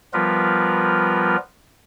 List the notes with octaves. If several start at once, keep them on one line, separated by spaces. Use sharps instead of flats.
F3 G3 B3 F4 A#4 B4